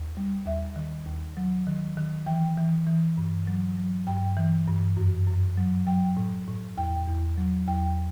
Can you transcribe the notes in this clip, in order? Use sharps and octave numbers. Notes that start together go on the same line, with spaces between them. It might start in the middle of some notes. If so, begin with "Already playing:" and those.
Already playing: D#2
G3
D#2 E5
D#3
D#2
F#3
D#3
D#3
E3 G5
E3
E3
G2
F#3
F#3
G2 G5
E3
G2
F#2
F#2
F#3
F#3 G5
A2
A2
E2 G5
E2
F#3
E2 G5